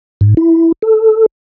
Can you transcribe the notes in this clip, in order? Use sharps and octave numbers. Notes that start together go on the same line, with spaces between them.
G#2
E4
A4